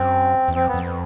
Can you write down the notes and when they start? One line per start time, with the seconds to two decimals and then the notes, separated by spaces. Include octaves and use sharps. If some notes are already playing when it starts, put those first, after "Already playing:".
Already playing: F#2 C4
0.48 E2
0.56 F2 C4
0.68 B3
0.74 F2